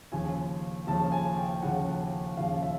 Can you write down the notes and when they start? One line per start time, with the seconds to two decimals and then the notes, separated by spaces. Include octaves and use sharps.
0.12 D#2 C#3 F3 G#5
0.87 D#2 C#3 F3 A5
1.12 G#5
1.37 G5
1.63 D#2 C#3 F3 F#5
2.37 D#2 C#3 F3 F5
2.62 E5